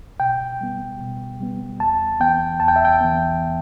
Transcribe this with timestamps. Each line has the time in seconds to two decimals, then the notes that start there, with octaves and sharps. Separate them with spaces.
0.20 B2 G5
0.61 G3 B3
1.00 B2
1.40 G3 B3
1.80 E2 A5
2.20 E3 B3 G5
2.60 E2 A5
2.68 G5
2.76 E5
2.85 G5
3.01 E3 B3